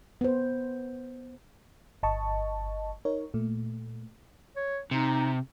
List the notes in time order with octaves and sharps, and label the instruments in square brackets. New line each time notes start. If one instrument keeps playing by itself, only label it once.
[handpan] B3 C5
[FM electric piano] G1 D#5 A5 C#6
D#4 A#4 C#5
A#2 A3
[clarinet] C#5
[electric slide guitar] C3 [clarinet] D#4